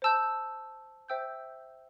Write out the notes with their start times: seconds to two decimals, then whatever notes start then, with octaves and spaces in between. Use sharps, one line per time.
0.02 C5 A5 E6 G6
1.08 C5 E5 G5 E6 G6